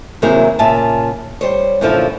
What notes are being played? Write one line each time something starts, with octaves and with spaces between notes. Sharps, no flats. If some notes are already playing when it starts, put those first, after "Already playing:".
C3 D#3 F#3 A#3 E4 G#4
A#2 C#3 F4 E5 G#5 A5
G3 C5 C#5
F#2 A#2 D3 F3 E4 F5